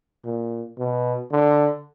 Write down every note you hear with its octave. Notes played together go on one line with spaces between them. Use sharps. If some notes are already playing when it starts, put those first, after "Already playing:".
A#2
B2
D3